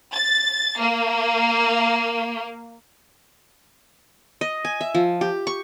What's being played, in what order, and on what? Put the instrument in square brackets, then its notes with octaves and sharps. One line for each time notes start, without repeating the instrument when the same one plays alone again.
[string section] A6
A#3
[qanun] D#5
G#5
E5
F3
G4
C#6